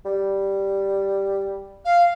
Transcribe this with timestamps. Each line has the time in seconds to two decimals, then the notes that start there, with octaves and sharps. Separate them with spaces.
0.05 G3
1.85 F5